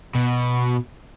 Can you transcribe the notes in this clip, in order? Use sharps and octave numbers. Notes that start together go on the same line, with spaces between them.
B2